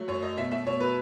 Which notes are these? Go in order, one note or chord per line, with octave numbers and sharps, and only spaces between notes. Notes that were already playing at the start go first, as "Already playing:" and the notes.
Already playing: F#3 A3
F#2 C#5
A3 D#5
B2 E5
A3 E5
B2 C#5
F#3 B4